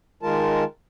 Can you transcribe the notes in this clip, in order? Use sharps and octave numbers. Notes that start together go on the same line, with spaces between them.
D#3 G#3 F4 A#4 A5